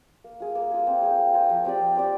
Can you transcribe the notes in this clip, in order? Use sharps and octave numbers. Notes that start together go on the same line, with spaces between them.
A#3
F4 G#4
A#3
F4 G#4
C4
F4 G#4 C5
C4
F4 G#4 C5
F3
C4 G4 D5
F3
C4 G4 D5